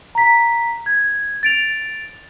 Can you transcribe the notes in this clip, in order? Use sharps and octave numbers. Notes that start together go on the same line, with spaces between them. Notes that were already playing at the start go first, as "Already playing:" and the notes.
A#5 B6
G#6
A6 D7 F7